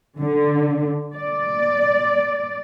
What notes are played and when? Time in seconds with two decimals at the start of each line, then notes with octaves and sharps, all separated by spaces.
0.20 D3
1.15 D5